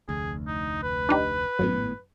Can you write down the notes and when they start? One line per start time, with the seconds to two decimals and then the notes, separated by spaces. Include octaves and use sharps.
0.08 F1 D2 G#4
0.47 D#4
0.83 B4
1.09 D4 D#4 G4
1.59 G#1 F#2 A2 B3